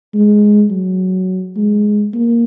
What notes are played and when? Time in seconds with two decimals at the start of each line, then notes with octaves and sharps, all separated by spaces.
0.14 G#3
0.70 F#3
1.56 G#3
2.14 A#3